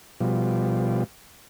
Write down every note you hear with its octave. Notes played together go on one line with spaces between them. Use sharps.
B2 F3 G3